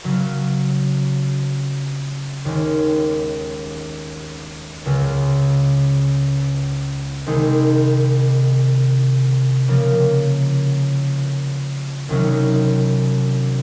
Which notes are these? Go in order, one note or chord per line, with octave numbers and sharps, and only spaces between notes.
C#3 F#3 C#4
D#2 D#3 G#3 C#4
C#2 C#3 G#3
C2 C3 D#3 G#3 D#4
C#3 F3 A#3
C2 C3 D#3 F#3 C#4